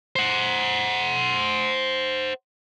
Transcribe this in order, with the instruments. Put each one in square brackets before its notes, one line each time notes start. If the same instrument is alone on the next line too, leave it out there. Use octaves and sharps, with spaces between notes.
[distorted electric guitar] C5 F#5